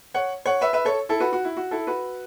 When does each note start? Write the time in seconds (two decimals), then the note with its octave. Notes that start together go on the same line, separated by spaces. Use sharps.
0.14 C#5 F#5
0.45 C#5 F#5
0.61 B4 E5
0.73 B4 E5
0.85 A4 C#5
1.09 E4 A4
1.20 F#4 B4
1.33 F#4
1.45 E4
1.57 F#4
1.71 E4 A4
1.87 F#4 B4